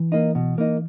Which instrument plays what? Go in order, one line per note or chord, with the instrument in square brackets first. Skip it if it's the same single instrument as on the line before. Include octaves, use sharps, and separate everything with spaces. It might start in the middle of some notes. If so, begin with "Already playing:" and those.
Already playing: [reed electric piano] E3
[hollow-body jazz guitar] A#3 D#4
B2
A#3 D#4